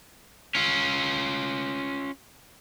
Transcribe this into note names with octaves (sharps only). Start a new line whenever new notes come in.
C#4 F4